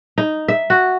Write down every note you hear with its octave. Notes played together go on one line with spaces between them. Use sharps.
D#4
E5
F#4